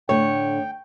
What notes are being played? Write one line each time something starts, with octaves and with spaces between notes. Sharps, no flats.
A2 D3 A3 C#5 G5